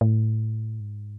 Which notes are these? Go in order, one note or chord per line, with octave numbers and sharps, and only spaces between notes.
A2
G#2